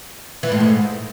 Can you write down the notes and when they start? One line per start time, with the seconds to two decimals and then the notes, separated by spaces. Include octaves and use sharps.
0.43 E3
0.52 A2
0.60 G#2